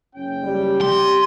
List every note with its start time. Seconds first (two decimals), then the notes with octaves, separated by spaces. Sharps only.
0.15 F#1 C#4 G5
0.44 G3
0.81 G4 C6